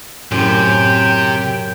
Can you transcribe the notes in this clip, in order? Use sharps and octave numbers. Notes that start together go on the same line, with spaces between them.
F#2 A2 C3 G5